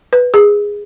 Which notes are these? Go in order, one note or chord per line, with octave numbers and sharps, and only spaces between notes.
B4
G#4